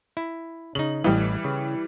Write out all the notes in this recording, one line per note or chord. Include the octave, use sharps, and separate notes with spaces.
E4
C#3 D#4 F#7
A1 E3 G3 D#5
C#3